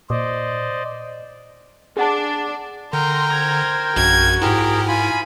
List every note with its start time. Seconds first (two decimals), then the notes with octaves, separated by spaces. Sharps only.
0.10 A#2 C5 D5 D#5
1.97 D4 G#4 F#5 A5
2.93 D3 A#4 G5 A#5 C6
3.30 C5 G#6
3.96 A#1 F#2 F#4 G#6
4.42 G#2 E4 G4 G#4 A#4
4.88 F4 G#5 B5